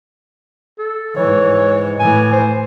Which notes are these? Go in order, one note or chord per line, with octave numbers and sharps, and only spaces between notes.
A4
G#2 E3 C#5
A2 E3 G#5
C5